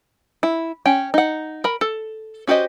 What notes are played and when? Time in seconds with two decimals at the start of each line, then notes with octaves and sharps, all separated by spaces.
0.43 E4
0.86 C#4 G5
1.14 D#4 F#5
1.64 A#4 B5
1.81 A4
2.47 C#4 F#4 G4 C5 D#5